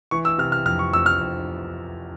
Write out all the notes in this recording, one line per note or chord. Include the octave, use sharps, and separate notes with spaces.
E3 C#6
E6
C3 F6
F6
F2 F6
C#6
F2 E6
F6
F2